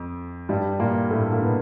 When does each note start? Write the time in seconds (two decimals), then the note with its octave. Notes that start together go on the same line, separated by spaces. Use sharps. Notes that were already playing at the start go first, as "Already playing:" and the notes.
Already playing: F2
0.49 G2 G3
0.80 A#2 A#3
1.11 A2 A3
1.32 A#3
1.42 B2 B3